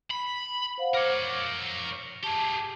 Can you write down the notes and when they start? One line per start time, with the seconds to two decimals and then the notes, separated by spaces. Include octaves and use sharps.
0.10 B5
0.78 C5 F5 F#5
0.95 A#4 C#5 D6
2.24 G4 G#4 A5